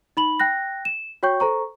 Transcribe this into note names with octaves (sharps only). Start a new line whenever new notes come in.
D#4 B5 F#7
G5 F#6 A#6
E7
F#4 C#5 G5 C#6 G6
A4 C5 A#5 C#6